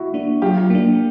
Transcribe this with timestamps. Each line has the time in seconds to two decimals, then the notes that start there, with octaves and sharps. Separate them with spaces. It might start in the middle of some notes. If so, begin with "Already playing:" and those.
Already playing: E4 F#4
0.14 A#3 D4
0.42 F#3 F4 G4
0.70 A#3 D4